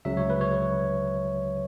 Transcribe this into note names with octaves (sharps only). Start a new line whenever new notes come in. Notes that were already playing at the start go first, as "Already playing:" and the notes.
C#2 C#3 F#3 E5
C#5
B4
C#5